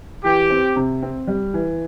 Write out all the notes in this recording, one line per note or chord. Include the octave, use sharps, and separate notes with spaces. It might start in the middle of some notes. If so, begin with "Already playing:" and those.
E3 G4
C4
C3
C4
G3
E3